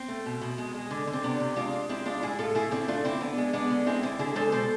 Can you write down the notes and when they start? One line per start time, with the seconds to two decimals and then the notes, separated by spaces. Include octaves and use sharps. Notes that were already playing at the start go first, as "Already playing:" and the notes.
Already playing: C4
0.08 A3
0.26 B2
0.41 B2
0.58 G#3
0.74 G#3
0.91 D3
1.07 D3
1.13 C4
1.24 C3 B3 D4
1.40 C3
1.56 G#3 D4 F4
1.73 G#3
1.89 G#3 C4 E4
2.06 G#3 D4 F4
2.22 A2 E4 G#4
2.39 A2 F4 A4
2.55 A3 E4 G#4
2.71 D3 C4 E4
2.88 A3 D4 F4
3.04 D3 C4 E4
3.21 D3 B3 D4
3.37 G#3
3.53 G#3 B3 D4
3.70 D3
3.86 G#3 C4 E4
4.03 D3 C4 E4
4.19 D3 E4 G#4
4.36 G#3 A4 C5
4.52 B2 A4 C5